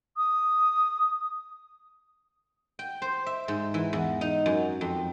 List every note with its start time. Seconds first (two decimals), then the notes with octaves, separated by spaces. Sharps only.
0.17 D#6
2.79 G5
3.02 C5
3.26 E5
3.48 G#2
3.74 E3
3.93 E2
4.21 D#4
4.46 F#2
4.81 F2